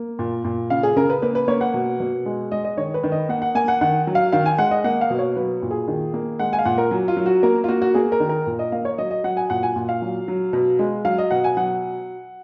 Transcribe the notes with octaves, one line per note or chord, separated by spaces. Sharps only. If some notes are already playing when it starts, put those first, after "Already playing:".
Already playing: A#3
A#2
A#2
C#3 F5
G#4
C#3 A#4
B4
A#3 B4
B4
A#3 C#5
F#5
B2
B2
G#3
G#3 D#5
D#5
D#3 C#5
B4
D#3
D#5
A#3 F#5
F#5
A#3 G#5
F#5
D#3 F#5
F#3
F5
D#3 F5
G#5
G#3 F#5
D#5
A#3 F#5
F5
B2
C#5
F#3 B4
A#2
G#4
D#3
A#3
G#3 F#5
G#5
F5
A#2 F#5
A#4
F#3
F4
F#3
F#4
A#3 A#4
F4
A#3 F#4
F#4
A#3 G#4
A#4
D#3
A#4
A#2
D#5
A#3 F5
C#5
F#3 D#5
D#5
F#3 F#5
G#5
A#2 F#5
G#5
A#2
F5
F#3
F#3
B2
G#3
F#3 F5
D#5
B2 F#5
G#5
F#3 F#5